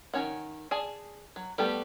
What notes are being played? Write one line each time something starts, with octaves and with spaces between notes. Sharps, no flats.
D#3 F#3 C#4 C#5 F#5
G#4 D5 G#5 A5
F#3
G3 A3 B3 G4 A4